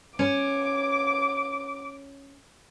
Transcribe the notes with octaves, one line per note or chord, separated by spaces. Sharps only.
C#4 D6